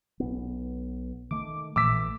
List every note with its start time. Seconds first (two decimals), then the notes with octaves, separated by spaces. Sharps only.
0.20 B1 B3
1.31 D#3 A3 D6
1.76 A#1 E3 A3 D6 E6 B6